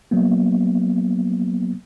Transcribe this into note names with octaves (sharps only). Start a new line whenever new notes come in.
F#3 A#3 B3